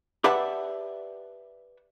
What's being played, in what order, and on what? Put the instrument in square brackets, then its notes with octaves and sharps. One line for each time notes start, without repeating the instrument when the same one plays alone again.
[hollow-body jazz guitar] G4 B4 D5 E5 F#5 A5